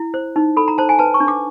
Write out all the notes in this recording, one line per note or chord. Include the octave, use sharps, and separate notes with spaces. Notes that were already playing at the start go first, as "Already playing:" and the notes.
Already playing: E4
C5
D#4
A4 B5
A#5
C5 A5
G#5
B4 A5
C#6
D4
D6